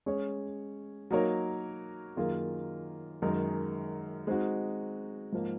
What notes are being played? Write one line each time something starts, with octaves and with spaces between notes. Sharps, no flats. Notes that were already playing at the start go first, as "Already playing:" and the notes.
G#3 C#4 G#4 C#5
F#3 A#3 D#4 A#4 C#5
F#2 D#3 A#3 F4 G#4
F#2 D#3 G#3 D#4 A#4
G#3 C4 D#4 F#4
G#2 F3 A#3